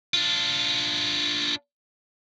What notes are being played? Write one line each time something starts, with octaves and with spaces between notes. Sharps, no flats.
D4 F4